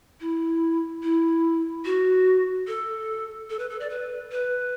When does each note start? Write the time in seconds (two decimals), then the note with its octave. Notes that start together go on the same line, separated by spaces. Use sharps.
0.21 E4
1.03 E4
1.85 F#4
2.67 A4
3.50 A4
3.59 B4
3.70 A4
3.80 D5
3.90 B4
4.31 B4